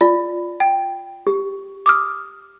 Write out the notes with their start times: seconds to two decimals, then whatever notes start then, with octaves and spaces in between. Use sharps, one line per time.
0.01 F4 D5
0.60 G5
1.27 G4
1.86 D6 D#6 F6